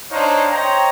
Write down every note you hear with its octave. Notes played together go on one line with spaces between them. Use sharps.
D4 D#4 C5 C#5 F5
C5 C#5 D#5 G5 A#5